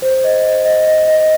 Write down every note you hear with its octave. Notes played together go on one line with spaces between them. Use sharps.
C5
D#5
C5
D#5
D#5
D#5